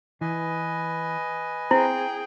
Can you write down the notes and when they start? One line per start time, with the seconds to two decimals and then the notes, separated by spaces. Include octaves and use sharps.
0.21 E3 B4 D#5 G#5
1.71 C4 E4 G#4 C5 G5